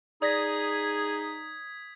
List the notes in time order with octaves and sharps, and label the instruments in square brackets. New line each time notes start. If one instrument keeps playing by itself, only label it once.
[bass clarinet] D#4 [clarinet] G#4 [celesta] D5 A#6 [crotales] D#6 G#6 B6